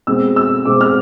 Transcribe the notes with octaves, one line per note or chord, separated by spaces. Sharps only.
B2 G#3 C4 E6
E6
B2 G#3 C4 D6
F6